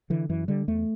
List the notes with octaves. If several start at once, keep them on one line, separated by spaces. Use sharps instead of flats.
D3 E3
F#2 E3
D3 G3
E2 A3